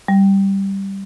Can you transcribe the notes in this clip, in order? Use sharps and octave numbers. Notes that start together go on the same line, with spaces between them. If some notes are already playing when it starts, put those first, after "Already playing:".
G3